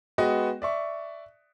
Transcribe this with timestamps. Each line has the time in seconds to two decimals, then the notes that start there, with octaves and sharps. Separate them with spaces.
0.18 G#3 B3 F#4 B4 D#5 G5
0.62 D5 E5 C#6